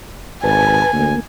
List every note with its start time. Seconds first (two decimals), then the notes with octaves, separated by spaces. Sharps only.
0.44 G#1 B4 G#5 A5
0.93 D2 A#3